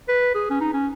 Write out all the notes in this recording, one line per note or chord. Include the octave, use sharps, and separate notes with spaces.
B4
G#4
C#4
D#4
C#4